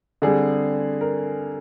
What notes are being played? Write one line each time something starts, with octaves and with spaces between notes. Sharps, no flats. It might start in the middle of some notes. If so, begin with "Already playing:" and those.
D3 G3 C4 G#4
A#4